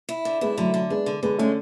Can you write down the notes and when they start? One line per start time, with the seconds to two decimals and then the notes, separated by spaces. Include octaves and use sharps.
0.09 E4
0.25 D3
0.41 G#3 B3 E4
0.57 D3 F#3 A3
0.74 D3
0.90 G#3 B3 D4
1.06 D3
1.23 D3 G#3 B3
1.38 G#3 A3 C#4